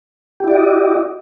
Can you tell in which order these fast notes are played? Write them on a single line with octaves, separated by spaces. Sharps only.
G4 E4 D5 F#4 D#5